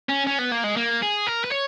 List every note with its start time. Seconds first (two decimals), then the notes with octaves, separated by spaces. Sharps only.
0.09 C#4
0.27 C#4
0.39 B3
0.52 A#3
0.64 G#3
0.76 A#3
1.02 G#4
1.27 A#4
1.44 B4
1.52 C#5